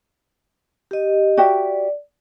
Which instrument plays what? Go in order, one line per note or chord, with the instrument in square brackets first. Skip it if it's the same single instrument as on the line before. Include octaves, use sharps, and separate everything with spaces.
[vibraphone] G4 D#5
[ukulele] F#4 G4 E5 [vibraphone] D5